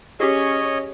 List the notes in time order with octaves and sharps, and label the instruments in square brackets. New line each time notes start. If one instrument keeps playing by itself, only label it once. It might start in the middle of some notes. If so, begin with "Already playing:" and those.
[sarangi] C#4 [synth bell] G4 G#4 [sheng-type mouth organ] C#5 D#5